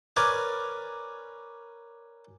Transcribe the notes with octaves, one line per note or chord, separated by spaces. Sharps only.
C#4 A#4 B4 D5 G#5